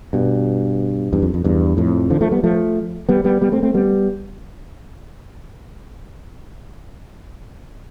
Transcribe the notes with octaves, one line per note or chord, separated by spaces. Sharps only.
G2 B2
E2 G2
F2
F2
E2 G2
F2 A2
D3 F3
F3 A3
G3 B3
F3 A3
G3 B3
G3 B3
G3 B3
A3 C4
A3 C4
G3 B3